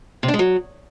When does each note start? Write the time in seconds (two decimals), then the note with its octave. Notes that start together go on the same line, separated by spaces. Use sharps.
0.23 C3
0.28 D4
0.34 G#3
0.39 F#3